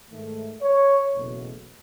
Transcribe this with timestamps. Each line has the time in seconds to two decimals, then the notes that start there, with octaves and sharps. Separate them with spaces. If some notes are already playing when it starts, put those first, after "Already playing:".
0.10 G#2 D#3 A3
0.61 C#5
1.13 F#1 E2 B2 A3